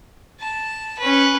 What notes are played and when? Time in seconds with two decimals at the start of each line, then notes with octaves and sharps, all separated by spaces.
0.40 A5
0.99 C#4 B4